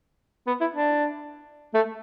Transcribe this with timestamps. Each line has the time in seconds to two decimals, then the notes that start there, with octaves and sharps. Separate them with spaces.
0.47 B3
0.61 E4
0.75 D4
1.74 A3